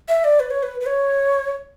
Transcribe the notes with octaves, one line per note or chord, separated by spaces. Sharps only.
E5
D5
B4
C#5
B4
B4
C#5